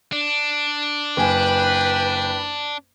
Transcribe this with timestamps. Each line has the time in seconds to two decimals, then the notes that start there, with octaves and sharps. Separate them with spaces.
0.12 D4
1.17 F#1 B4 G5 G#5